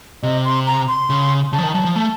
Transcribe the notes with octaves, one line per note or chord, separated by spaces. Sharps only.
C3 D#5
C6
A#5
C6
C#3
C#3 A5
F3
D#3
F#3 A5
F3
A3 A5